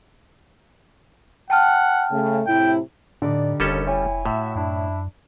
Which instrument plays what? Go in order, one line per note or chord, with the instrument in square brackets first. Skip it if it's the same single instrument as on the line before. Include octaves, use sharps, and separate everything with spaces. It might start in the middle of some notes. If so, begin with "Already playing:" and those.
[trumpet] F#5 [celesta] G5 A5 F6
[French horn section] C#3 A3
[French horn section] A2 C3 E4 [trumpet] G5
[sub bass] A2 [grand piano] D3 [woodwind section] G3 D#4 D5
[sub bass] F1 [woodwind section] D#2 [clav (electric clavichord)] G3 C#4 A4
[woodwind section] E4 G5 G#5 [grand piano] C#5
[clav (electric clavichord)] A2 [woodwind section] F#4 E5
[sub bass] F#2 [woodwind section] D4 E4